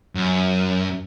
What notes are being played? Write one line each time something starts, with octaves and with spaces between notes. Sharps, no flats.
F#2